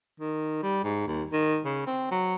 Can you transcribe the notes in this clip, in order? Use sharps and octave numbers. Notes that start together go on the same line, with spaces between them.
D#3
G3
G#2
D#2
D#3
C#3
C4
F#3